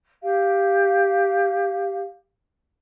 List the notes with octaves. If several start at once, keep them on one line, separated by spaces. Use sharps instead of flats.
G4 F5